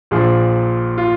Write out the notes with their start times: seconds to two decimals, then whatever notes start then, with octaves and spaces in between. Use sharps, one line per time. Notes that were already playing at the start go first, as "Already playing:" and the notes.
0.11 A#1 A#2 F3 G#4
0.98 F4